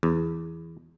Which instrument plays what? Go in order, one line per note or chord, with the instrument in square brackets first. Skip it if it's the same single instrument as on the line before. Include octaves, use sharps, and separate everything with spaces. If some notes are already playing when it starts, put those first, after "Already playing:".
[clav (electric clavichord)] E2